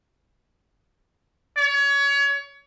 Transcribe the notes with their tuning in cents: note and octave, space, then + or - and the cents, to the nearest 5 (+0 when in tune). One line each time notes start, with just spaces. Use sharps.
C#5 +30